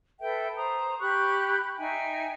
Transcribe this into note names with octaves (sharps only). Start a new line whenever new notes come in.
A4 B4 E5 G5
C5 A#5 D#6
G4 B5 C#6 F#6
D#4 E5 G5 G#5